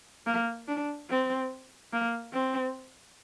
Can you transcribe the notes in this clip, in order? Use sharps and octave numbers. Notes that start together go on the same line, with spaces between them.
A#3
D4
C4
A#3
C4